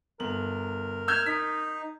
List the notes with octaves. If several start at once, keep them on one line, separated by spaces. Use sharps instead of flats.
G1 A#4 F#7
E6 F6 G6 G#6
D#4 B6